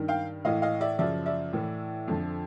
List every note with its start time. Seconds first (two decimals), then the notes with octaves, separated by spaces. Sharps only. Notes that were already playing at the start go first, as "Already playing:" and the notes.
Already playing: G2 D#3
0.08 F5 G5
0.45 A2 E3 D#5 F5
0.62 D#5 F5
0.81 D5 E5
0.99 F#2 C#3 F3 D5 E5
1.26 D5 E5
1.53 A2 E3
2.08 F2 D3 F3